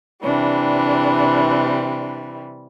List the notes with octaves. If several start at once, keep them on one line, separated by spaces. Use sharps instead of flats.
C3 E3 G3 D4